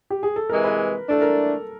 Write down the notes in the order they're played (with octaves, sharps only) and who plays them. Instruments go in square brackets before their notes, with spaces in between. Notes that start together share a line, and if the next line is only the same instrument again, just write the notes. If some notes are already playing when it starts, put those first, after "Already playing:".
[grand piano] G4
G#4
A4
[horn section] C3 E3 G#3 [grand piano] A#4
[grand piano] B4
[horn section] E3 A3 D4 [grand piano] A4
[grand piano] A#4